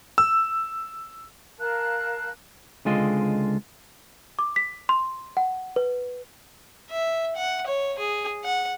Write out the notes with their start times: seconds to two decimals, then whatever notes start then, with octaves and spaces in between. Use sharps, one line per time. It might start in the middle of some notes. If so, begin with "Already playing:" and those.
0.18 E6
1.59 A#4 F5 A5 F#6
2.85 C#2 D3 G#3 C4 F4 D#5
4.39 D6
4.56 B6
4.89 C6
5.37 F#5
5.76 B4
6.91 E5
7.36 F#5
7.67 C#5
7.99 G#4
8.44 F#5